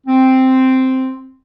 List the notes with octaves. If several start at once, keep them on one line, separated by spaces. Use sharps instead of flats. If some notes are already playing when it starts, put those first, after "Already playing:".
C4